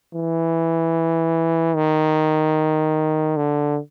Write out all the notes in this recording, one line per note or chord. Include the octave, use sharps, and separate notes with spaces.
E3
D#3
D3